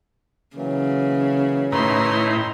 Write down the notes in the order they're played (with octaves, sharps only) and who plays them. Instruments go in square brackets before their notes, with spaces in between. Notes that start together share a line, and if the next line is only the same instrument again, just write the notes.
[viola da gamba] C#3 [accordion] E3 F#3 A#3
[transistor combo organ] A2 D#4 E4 [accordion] D#3 B4 C#5 [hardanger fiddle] A#5 C6